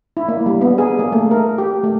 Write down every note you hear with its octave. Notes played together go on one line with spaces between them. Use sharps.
E4
A#3
G3
B3
G#4
A#3
A3
A#4
G4
A3